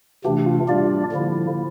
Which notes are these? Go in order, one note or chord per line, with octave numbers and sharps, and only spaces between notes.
C3 E3 A3 D4 G4
F4
G3 D4 F4 G4 D5
D3 F3 A#3 E4